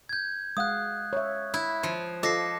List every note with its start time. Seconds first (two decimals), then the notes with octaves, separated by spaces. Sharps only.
0.09 G6 G#6
0.57 G#3 F5 F#5 D#6 F#6
1.13 C#5 E5
1.54 E4
1.83 F3
2.23 F4 A4 C5 D#5 D6 A#6 C7